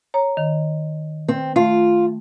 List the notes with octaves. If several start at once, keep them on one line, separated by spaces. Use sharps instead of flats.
C#5 A#5
D#3
C4
A3 F4